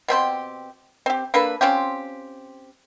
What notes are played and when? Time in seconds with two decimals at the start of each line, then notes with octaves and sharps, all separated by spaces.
0.08 B2 C4 G4 C6
1.06 C4 G4
1.34 A#3 D4 A4 B4
1.61 C4 C#4 F4 G4